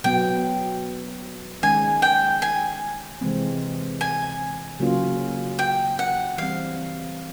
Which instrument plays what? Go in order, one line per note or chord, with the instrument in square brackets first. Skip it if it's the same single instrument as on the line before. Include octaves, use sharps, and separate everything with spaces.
[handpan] B2 F#3 B3 [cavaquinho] G5
[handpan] D#3 G#3 C#4 [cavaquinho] G#5
[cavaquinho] G5
G#5
[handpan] C3 E3 G#3 C4
[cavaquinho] G#5
[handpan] C#3 F#3 A#3 C#4 F4
[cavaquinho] G5
F#5
[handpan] E3 G3 C4 [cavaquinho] F5